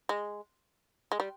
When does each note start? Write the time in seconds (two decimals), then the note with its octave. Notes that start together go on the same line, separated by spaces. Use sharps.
0.09 G#3
1.12 G#3
1.20 G3